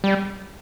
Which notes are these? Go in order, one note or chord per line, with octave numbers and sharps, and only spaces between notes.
G3